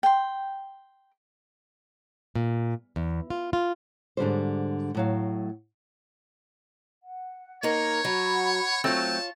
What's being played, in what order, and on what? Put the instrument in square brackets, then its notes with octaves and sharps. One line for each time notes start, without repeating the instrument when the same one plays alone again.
[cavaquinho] G5 C6
[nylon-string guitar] A#2
E2
F4
F4
G#2 D3 G3 C5
A2 F#3 F5
[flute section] F#5
[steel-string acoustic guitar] A#3 D#4 A#4 [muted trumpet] C#5
[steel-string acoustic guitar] F#3 [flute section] F#5 B5
[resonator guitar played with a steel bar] F#3 A3 C4 [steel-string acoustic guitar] F4 C#5 [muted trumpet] A5